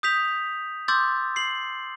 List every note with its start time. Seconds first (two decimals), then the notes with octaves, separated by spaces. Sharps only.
0.03 D#6 G6 B6 F7
0.88 C6 D6 E6 G6 A6
1.36 C7 F#7